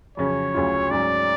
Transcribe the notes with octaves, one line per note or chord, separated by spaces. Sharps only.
F2 C#3 F#3 C#4 C#5
D2 C#3 F#3 C#4 F4
G#2 F#3 C#4 D5